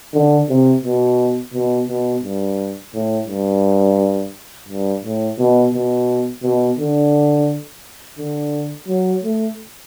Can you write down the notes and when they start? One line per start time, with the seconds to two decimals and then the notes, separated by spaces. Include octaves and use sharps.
0.13 D3
0.49 C3
0.84 B2
1.54 B2
1.89 B2
2.23 G2
2.94 A2
3.28 G2
4.69 G2
5.04 A2
5.39 B2
5.74 B2
6.43 B2
6.78 D3
8.18 D3
8.88 F#3
9.24 A3